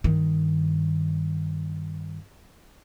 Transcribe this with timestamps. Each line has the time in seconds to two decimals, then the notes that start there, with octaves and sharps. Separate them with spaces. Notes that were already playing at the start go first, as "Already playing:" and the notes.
0.04 G2 D#3